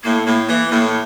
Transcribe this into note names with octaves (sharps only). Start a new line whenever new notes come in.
A2 A#3
A2 A#3
E3 A#3
A2 A#3